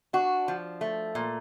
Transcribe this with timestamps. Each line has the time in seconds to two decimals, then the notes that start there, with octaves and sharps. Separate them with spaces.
0.13 D4 F#4
0.48 F3
0.81 A3
1.15 A#2